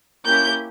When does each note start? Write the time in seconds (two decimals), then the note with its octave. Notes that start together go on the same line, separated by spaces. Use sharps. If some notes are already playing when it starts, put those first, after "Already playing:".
0.25 A#3 C#4 E4 G4 G6